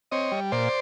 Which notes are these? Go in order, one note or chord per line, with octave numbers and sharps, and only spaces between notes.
C4 C#5 D#5
G3
A#2 C5 D5